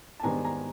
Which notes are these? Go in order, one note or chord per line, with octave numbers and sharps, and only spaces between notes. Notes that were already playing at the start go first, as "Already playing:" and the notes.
A5
G#2 D#3 G3 B3 D4 G#5 A#5
G#5 A#5